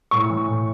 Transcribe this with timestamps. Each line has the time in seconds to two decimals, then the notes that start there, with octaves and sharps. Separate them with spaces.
0.11 A2 C#6
0.30 E3
0.48 A2